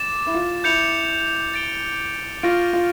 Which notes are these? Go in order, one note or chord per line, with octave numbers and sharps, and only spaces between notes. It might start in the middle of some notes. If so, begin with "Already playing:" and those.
Already playing: D6 A6 E7
E4
F4
E4 G6 C#7 F7
A6 D7 G7
F4 C#6 F6 A#6 D7
F4